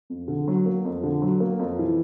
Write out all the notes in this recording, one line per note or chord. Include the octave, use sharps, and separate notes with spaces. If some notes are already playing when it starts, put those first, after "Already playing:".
F2
D3
F#3
A#3
F2
D3
F#3
A#3
F2
E3